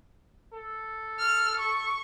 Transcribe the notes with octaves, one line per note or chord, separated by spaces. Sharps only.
A4
F6
C#6